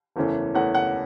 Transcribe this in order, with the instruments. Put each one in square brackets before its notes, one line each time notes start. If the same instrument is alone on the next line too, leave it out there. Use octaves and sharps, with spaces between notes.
[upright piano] F#1 E2 E3 A3 C#4
F#1 E2 E3 A3 C#4 F#5
F#5